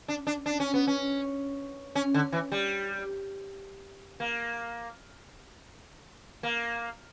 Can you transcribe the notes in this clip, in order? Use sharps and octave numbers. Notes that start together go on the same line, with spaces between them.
D4
D4
D4
C#4
B3
C#4
C#4
D3
E3
G3
A#3
A#3